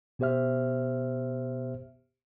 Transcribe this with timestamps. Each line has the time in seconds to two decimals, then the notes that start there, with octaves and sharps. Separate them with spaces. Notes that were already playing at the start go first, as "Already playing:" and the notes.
0.19 B2 B3 G4 C5 E5 F6